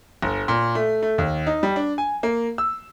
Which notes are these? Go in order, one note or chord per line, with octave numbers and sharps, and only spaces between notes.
G1
A#2
A3
A3
D#2
D#4
G3
D4
G#5
A#3
E6